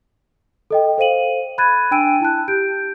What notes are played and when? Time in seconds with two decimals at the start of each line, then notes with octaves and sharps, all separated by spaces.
0.70 A4 D#5 G5
0.98 A4 C5 F5 D#7 F#7
1.58 B5 F#6 G#6 A6 D#7
1.91 D4 G5 G#5 E6 D7 D#7
2.21 E4 A5 F#6
2.48 G4 G6 D7